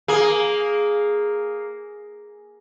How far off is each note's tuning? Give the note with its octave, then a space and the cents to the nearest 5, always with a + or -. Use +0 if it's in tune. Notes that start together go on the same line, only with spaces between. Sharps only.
A#3 +0 G#4 +0